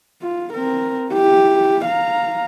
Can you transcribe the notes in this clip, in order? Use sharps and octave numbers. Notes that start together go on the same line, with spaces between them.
F4
C4 A#4
E4 G4
F5 A#5